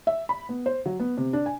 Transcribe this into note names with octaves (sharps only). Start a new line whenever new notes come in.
E5
B5
B3
C5
F#3
B3
C3
D4
G#5